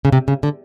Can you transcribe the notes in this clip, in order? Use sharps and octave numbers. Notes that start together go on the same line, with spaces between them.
C#3
C3
C#3
D3